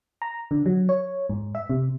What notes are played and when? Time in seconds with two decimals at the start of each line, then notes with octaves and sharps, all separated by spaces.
0.22 A#5
0.51 D3
0.66 F#3
0.89 C#5
1.30 G#2
1.55 E5
1.70 C3